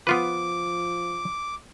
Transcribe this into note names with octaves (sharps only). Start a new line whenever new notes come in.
F3 B3 F4 B4 D6